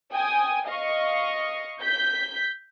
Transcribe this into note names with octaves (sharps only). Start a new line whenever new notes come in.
G5 G#5 D#6
D#5 F5 C#6
G6 B6